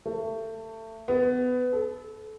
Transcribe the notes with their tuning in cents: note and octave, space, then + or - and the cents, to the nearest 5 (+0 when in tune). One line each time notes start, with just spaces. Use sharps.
A3 +25
B3 +20
A4 -25